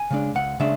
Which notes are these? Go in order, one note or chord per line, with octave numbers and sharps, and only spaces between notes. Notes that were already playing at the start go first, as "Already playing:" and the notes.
Already playing: G#5
C#3 G#3 D4
C#2 F#5
C#3 G#3 D4 E5